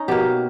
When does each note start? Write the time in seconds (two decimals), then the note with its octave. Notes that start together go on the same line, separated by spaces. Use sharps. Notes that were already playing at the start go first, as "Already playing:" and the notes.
Already playing: C#4 D#4
0.08 B2 A#3 G4